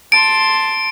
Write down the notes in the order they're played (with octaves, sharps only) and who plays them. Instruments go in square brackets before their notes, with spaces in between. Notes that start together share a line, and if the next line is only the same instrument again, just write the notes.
[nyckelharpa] A5 C6 [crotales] D7